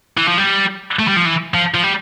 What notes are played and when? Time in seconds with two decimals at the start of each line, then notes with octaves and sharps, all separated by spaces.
0.17 E3
0.28 F3
0.37 G3
0.99 A3
1.08 G3
1.16 F3
1.25 E3
1.54 F3
1.74 F3
1.83 G3